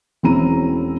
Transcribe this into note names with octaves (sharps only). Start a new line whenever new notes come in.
E1 C4 C#4 E4 A#5 D#7